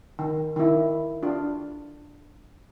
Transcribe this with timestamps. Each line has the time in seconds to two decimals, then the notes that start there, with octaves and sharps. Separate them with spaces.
0.19 D#3
0.56 D#3 E4
1.23 D4 F4